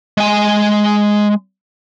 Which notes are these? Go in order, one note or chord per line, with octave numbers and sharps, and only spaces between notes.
G#3 G#5